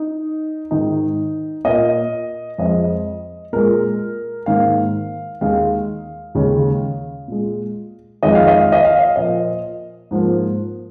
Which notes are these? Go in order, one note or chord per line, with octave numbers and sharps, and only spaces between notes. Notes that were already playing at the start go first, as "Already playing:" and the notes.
Already playing: D#4
G#2 D#3 G#3 D#4
A#2 A#3 D#5
F2 F3 G#3 D#5
A#2 G#3 A#4
G#2 D#3 A#3 F5
D#2 D#3 G#3 F5
D#2 C#3 G#3
A#2 G#3
F2 D#3 G#3 D#5
F5
D#5
F5
D#5
F5
D#5
A#2 F3 A#3 D#5
G#2 F3 A#3